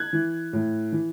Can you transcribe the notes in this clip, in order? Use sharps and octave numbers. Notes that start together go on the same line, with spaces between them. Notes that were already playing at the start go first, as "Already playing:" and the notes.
Already playing: F#6 G#6
E3
A2
E3